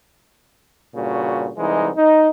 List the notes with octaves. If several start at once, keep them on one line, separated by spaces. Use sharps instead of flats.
G2 A#2 C#3 F#4
C2 E3 G#3 D#4
D#4